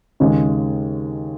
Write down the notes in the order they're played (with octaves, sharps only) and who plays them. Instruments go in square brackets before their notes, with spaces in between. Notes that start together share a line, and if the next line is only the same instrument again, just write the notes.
[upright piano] D#2 C#3 G#3